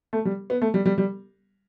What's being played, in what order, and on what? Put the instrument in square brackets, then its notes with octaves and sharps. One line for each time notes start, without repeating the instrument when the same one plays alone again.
[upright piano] A3
G3
B3
A3
G3
G3
G3